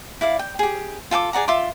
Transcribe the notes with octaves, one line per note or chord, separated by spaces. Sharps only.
E4 D5 F5
G5
G4 G#4
F4 A4 G5 D6
G#4 D5 F#5 A#5
F4 E5 C6 D6